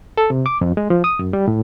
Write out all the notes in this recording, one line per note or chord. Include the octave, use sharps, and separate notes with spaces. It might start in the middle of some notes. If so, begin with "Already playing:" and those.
A4
C3
D6
F2
G#3
F3
D#6
F#2
G3
A2